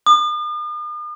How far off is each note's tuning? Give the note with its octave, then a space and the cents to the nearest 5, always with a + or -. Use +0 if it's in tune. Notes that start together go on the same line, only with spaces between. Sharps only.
D#6 -45